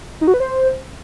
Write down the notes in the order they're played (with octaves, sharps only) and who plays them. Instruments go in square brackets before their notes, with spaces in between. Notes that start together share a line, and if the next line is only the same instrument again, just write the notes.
[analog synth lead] D#4
F#4
B4
C5